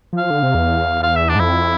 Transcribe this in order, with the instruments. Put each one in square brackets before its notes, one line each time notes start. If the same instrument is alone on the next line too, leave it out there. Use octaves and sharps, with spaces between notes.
[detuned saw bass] F3
[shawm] F5
[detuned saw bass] D3
C3
E2
[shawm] F5
E5
D4
[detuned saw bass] G#2
[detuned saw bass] F2 [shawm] E4